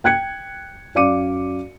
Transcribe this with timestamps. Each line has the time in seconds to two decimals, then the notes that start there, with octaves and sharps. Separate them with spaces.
0.04 G5 F#6 G#6 C#7
0.95 F#2 D5 F5 D6 C#7 D#7